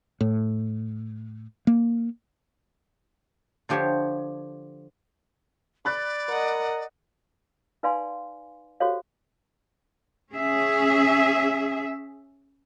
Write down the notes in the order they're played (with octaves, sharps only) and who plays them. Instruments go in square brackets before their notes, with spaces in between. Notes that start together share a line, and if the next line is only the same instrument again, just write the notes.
[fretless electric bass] A2
A#3
[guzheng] D3 F3 G4 C5 C#5
[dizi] D5 [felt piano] B5 F#6 A6
[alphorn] A#4 [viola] D#5 F#5
[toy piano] D#4 B4 D5 F5 G#5 C6
F#4 G4 A4 C5 C#5 F5
[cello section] C#4 G#4 E5